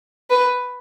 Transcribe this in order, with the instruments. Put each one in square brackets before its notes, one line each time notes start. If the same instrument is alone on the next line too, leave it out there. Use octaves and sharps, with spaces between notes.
[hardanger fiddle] B4